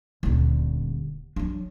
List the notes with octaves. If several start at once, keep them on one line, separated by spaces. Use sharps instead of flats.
D#1 D2
F#3 D4